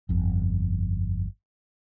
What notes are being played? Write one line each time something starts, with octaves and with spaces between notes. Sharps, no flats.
G1 F2